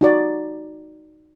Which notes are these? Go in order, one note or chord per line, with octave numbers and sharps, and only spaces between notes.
D#4 F#4 D5